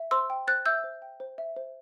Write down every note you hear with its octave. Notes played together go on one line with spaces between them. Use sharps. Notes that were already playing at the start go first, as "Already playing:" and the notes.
Already playing: E5
C5 C6 E6
G5
C5 F#6 A6
E5 E6 G6
C5
G5
C5
E5
C5